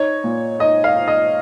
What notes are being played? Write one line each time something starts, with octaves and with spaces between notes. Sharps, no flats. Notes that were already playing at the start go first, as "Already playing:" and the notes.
Already playing: D#4 C#5
A#2
D#4 D#5
F5
D#4
D#5